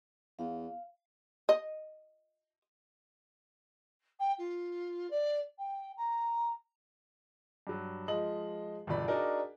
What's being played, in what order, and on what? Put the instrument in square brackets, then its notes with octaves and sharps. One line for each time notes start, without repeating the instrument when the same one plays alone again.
[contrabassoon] E2 [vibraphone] F5
[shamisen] D#5
[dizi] G5
F4
D5
G5
A#5
[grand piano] G2 F#3
F3 G#3 D#5 F#7
G1 E2 B2 D5 B5 B6
D4 D#4 F#4 G#4 A#4 D5